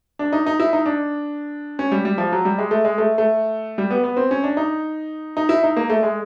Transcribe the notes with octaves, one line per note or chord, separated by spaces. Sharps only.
D4
D#4
D#4
E4
D#4
D4
C#4
G3
G3
F3
F#3
G3
G#3
A3
G#3
A3
A3
G3
B3
B3
C4
C#4
D4
D#4
D#4
E4
D#4
A#3
A3
G#3